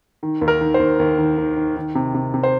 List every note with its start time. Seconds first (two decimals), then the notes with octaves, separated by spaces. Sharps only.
0.23 D#3
0.41 D#2
0.48 A#4
0.61 D#3
0.74 C5
0.80 D#2
0.99 D#2
1.18 D#3
1.38 D#3
1.57 D#3
1.77 D#3
1.95 C3
2.14 C3
2.34 C3
2.43 C5